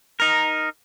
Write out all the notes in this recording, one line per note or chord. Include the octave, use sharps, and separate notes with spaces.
D#4 A#4